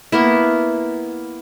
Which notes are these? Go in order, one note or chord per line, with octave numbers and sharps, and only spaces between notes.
A#3 B3 E4